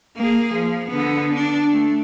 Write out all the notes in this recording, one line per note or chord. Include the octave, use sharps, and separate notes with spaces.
A#3 G#4
F3
D3 B3
D4
A3